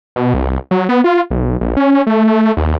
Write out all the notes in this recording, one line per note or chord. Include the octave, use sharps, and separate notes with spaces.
B2
C2
F#3
B3
F4
B1
A#1
C#4
A3
D#2